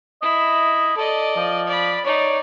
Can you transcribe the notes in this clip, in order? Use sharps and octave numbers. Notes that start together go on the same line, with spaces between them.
E4 D#5
A4 D5 D#5
F3
D5 B5
D#4 C#5 D5